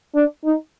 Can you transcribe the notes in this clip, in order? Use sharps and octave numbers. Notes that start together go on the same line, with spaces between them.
D4
D#4